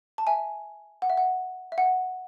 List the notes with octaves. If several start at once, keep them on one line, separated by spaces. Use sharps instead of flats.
A5
E5 G#5
F#5
E5
F#5
E5
F#5